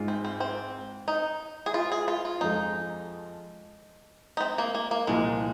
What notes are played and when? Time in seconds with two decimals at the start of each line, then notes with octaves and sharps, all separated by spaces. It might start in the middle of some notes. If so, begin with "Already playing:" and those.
Already playing: G#2 G#3 F4
0.08 C4
0.25 C4
0.40 C4
1.08 D#4
1.66 G#4
1.74 F4
1.92 G#4
2.08 F4
2.25 F4
2.41 F2 F3 G#3 D#4
4.37 D#4
4.41 C4
4.58 A#3
4.75 A#3
4.91 A#3
5.07 C2 A#2 F3 G#3